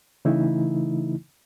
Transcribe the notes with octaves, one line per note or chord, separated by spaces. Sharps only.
C#3 E3 A3 D#4 E4